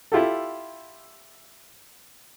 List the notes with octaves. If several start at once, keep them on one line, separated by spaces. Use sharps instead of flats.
E4 F4 G4 A4